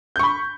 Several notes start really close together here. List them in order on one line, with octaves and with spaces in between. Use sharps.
G6 C#6 B5